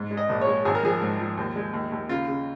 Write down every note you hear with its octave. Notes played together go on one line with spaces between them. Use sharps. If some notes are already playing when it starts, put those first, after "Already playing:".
Already playing: G#2
G#3
D#5
A#1
C#5
G#3
G#1 G#4
A#4
F3 G#4
G#2
F3
D#2
G#3
D#2
D#2
C#3 F4
C#3